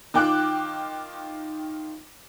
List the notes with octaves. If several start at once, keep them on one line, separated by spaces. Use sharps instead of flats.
D#3 F4 G5 D6 F#6